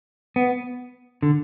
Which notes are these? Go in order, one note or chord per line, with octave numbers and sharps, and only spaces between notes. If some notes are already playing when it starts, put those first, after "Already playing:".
B3
D3